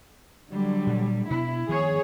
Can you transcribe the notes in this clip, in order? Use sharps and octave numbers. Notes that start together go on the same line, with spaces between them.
D3 F#3 G3
A#2
B2 B3 D4 E4
D#3 F3 B3 G#4 C#5